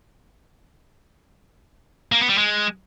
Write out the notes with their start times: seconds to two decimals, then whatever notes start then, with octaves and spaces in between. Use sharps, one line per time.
2.12 A#3
2.21 B3
2.29 G3
2.38 G#3